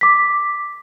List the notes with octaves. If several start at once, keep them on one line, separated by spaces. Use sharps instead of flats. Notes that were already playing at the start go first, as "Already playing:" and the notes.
D6 B6